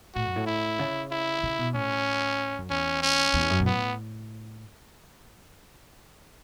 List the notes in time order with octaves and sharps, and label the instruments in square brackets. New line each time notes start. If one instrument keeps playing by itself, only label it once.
[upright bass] A2 [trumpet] F#4
[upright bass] F#2
A2
[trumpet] E4
[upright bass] C#3
[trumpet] E4
[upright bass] C#3
B2
[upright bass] A2 [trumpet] C#4
[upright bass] F#2
[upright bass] E2 [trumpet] C#4
[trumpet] C#4
[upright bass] E2
F#2
B2
[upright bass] A2 [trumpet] B3